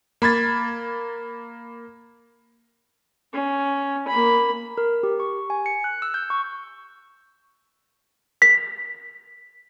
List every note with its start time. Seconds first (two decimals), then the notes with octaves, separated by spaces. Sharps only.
0.22 A#3 B5 G#6 A6
3.33 C#4
4.08 A#3 B5
4.78 A#4
5.03 G4
5.20 C#6
5.50 G#5
5.66 C#7
5.84 F#6
6.02 E6
6.14 G6
6.30 C#6
8.42 B6